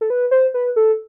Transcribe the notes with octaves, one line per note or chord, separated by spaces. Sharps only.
A4
B4
C5
B4
A4